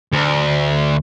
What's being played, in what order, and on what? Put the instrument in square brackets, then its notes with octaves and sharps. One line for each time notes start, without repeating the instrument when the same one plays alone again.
[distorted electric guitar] D2